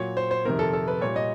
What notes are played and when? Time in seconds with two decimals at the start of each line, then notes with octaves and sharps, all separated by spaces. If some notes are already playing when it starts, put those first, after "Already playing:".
Already playing: A#2 F#3 C#5
0.17 C5
0.31 C5
0.45 F2 C3 D#3 A#4
0.59 A4
0.73 A4
0.88 B4
1.01 A#2 G3 C#5
1.16 D#5